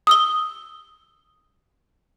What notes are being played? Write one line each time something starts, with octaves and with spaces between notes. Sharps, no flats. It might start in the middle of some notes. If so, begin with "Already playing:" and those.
D#6 E6 G7